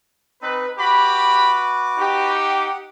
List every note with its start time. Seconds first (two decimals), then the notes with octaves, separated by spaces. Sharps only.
0.42 C4 D#4 B4
0.78 F#4 G4 B4 B5 D6
1.98 D#4 G4
2.34 F#5